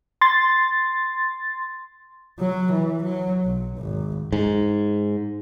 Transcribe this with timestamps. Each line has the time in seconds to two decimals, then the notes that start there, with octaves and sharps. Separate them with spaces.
0.21 C6 A6
2.39 F#3
2.72 E3
3.02 F#3
3.44 B1
3.78 G#1
4.33 G#2